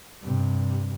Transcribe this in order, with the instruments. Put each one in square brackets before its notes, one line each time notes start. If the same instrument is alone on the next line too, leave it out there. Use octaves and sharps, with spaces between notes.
[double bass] G2 C3